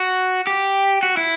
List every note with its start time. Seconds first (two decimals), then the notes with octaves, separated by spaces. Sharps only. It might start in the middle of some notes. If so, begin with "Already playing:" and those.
Already playing: F#4
0.47 G4
1.03 F#4
1.17 E4